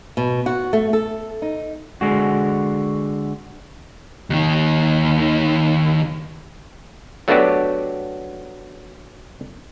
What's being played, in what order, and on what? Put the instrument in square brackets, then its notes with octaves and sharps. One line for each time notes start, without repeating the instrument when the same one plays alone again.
[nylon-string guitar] B2
F#4
A3
A4
D#4
[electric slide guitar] D3 G#3 F#4
[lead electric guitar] D#2 D#3
[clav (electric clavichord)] F#3 A3 B3 D4 F#4 G4